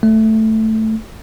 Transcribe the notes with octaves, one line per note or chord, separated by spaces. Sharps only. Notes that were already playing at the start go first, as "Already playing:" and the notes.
A3